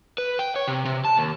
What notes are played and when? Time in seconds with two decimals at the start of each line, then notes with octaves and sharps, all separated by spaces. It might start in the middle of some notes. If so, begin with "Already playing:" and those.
0.18 B4
0.39 G5
0.56 C#5
0.67 C3
0.85 C3
1.05 A5
1.17 D#2